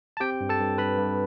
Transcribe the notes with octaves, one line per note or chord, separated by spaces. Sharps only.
A5
C4 G4 G5
G2
A4 A5
G2
G2 B4 B5
G2